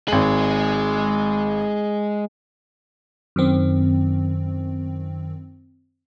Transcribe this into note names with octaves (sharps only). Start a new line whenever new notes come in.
G#1 G#3 G#4 F#7
F#2 D#3 C4